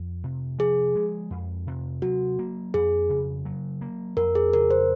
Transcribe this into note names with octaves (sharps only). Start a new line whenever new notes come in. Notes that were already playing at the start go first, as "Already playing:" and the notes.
Already playing: F2
C3
F3 G#4
G#3
F2
C3
F#3 F#4
A#3
F2 G#4
C#3
F#3
A#3
F2 A#4
G#4
C#3 A#4
C5